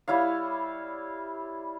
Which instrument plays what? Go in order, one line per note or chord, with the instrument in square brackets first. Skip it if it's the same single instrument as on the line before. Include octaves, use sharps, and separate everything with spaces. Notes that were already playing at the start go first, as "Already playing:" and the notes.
[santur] G3 E4 C#5 F5